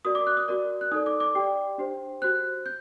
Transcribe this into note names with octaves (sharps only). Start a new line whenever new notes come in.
F#4 A#4 D5 D#6
D6
F#6
D#6
F#4 A#4 D5
F#6
D#4 A4 D5 D#6
D6
D6
G4 D5 G5
D4 G4 C5
F#4 C5 F#6
G6